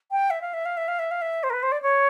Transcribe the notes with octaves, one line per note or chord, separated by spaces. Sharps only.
G5
E5
F5
E5
F5
E5
F5
E5
F5
E5
C5
A#4
B4
C5
D5
C#5